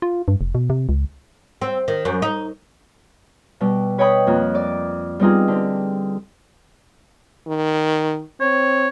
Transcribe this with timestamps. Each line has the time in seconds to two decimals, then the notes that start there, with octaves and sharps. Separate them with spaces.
0.02 F4
0.28 G2
0.41 F1
0.55 B2
0.70 C3
0.89 C#2
1.61 C4
1.88 D#3
2.05 F#2
2.22 D#4
3.61 B2 G3
3.98 B4 C#5 D#5 G5 B5 D#6
4.27 F2 A#3 F#6
4.55 D5 D6
5.19 G3 B3 C4 D#4 F4 G#4
5.48 D3 C4
7.47 D#3
8.40 C4 C#5